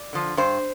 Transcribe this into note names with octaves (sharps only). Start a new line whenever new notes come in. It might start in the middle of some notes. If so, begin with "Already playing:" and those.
Already playing: D5
D3 F3
G2 C5